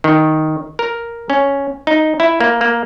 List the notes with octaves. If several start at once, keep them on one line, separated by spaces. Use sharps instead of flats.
D#3
A#4
C#4
D#4
E4
A#3
A#3